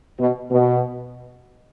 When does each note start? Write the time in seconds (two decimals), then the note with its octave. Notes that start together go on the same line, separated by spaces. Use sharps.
0.20 B2
0.51 B2